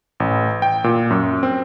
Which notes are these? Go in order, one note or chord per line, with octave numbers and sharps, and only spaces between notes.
A1
G5
A#2
F#2
C4